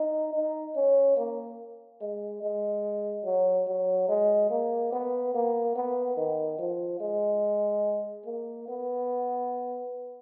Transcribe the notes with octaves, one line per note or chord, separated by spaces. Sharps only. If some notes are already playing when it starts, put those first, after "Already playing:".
Already playing: D#4
D#4
C#4
A#3
G#3
G#3
F#3
F#3
G#3
A#3
B3
A#3
B3
D#3
F3
G#3
A#3
B3